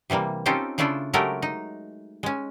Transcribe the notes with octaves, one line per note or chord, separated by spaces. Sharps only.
C3 E3 G3 A#3
C4 C#4 D#4 F4 G4 A4
C#3 A3 D4 E4 F4 A4
F#3 G#3 A3 G4 A4 A#4
D#4
G#3 C#4